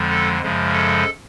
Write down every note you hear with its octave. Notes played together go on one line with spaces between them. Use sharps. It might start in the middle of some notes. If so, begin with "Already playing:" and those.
Already playing: F2 D3 F3 G#3
A4
F#2 C#3 F3 G#3
A4